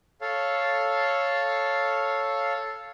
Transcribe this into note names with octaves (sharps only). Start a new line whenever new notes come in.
A4 C#5 F5